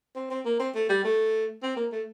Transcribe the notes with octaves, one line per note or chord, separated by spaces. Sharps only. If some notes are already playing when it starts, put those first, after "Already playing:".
C4
C4
A#3
C4
A3
G3
A3
C4
A#3
A3